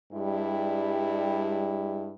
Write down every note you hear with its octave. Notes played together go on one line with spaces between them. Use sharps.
G2 G3 G#3 E4